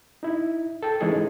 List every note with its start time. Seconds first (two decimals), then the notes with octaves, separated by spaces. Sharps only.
0.23 D#4 E4
0.83 A4 G5
1.00 E3 G#3 C#4 D#4 G#4 A4